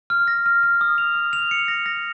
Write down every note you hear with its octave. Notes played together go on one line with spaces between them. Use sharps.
F6
A#6
F6
F6
D#6
F7
D#6
F7
C#7
A#6
A#6